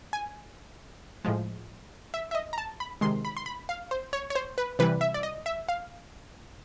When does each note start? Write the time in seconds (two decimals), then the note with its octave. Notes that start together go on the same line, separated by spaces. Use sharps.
0.13 G#5
1.25 A2 F3 G#3
2.14 E5
2.31 E5
2.35 D#5
2.53 A#5
2.58 A5
2.80 B5
3.01 C3 D#3 G#3 C6
3.25 B5
3.37 C6
3.46 B5
3.69 F5
3.91 C5
4.13 C#5
4.30 C#5
4.35 C5
4.58 B4
4.79 C3 E3 G3 B4
5.01 E5
5.14 D5
5.23 D#5
5.46 E5
5.69 F5